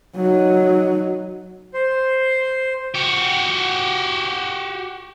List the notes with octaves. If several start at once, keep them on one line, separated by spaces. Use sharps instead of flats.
F#3 D#4
C5
F#4 G4